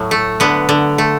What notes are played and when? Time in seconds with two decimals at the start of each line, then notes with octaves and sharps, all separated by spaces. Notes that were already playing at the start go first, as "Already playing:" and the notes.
Already playing: A2 F#3
0.11 A3
0.40 D3 B3
0.69 D3
0.98 A3